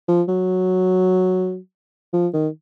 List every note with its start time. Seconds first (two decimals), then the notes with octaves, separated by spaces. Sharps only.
0.08 F3
0.28 F#3
2.13 F3
2.34 D#3